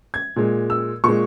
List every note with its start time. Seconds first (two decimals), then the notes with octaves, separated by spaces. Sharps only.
0.14 G#6
0.36 A#2 G#3
0.70 E6
1.04 A#2 G#3 C#6